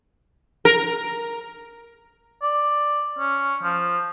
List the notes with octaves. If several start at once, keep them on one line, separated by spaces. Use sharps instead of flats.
A#4
D5
C#4
F3